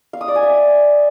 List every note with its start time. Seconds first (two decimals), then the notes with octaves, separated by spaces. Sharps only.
0.13 F5
0.21 D#6
0.28 D5
0.35 G#5
0.43 E5